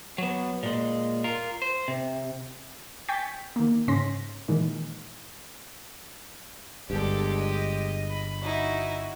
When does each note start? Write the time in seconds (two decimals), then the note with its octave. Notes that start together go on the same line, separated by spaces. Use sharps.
0.18 F#3 B3
0.63 A#2 G#3
1.24 F4 A#4
1.62 C5
1.88 C3
3.08 G5 G#5 C#6 G6 A6 B6
3.56 D#3 A#3
3.88 G#2 C#3 C#4 C6 A#6 B6
4.48 A#2 D#3 E3 G#3
6.90 G1 G2 G#3 D4 G4 A4
7.39 D#5
8.09 B5
8.42 D#4 E4 F#4